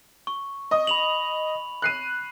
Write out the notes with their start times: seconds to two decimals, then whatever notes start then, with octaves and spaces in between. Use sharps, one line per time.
0.27 C#6
0.71 D#5 D#6
0.87 B5 F7 F#7
1.82 F#6 C7 D#7